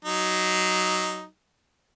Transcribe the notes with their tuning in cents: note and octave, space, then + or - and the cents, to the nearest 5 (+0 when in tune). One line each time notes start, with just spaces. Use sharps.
F#3 +15 D#4 +0